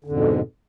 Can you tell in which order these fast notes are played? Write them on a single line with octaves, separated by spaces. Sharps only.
D3 F2 G#2 B2